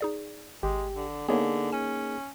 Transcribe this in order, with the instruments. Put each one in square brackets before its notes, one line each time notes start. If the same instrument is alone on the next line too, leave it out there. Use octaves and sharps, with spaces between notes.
[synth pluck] D#4 G#4 D5
[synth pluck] G#1 [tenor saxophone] G#3 [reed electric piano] G4
[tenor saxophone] D3
[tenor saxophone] D3 [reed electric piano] A#3 D#4 G#4 [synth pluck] B3 C#5
[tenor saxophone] C#4 [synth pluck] G#5